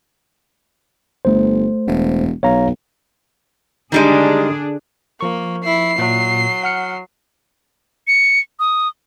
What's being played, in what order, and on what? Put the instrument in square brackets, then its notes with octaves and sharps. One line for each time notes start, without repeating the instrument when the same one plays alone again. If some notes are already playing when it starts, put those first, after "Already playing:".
[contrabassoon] G1 [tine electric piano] A3 C5
[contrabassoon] E1
[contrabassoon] B1 [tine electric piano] C#5 F5 A#5
[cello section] D3 D4 G#4 [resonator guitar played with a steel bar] D#3 G3 G#3
[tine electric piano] F3 C#6 [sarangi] A#3
[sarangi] E4 [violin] C7
[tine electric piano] A#2 [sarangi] F#3
[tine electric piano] F#5 F6 C#7
[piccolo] C#7
D#6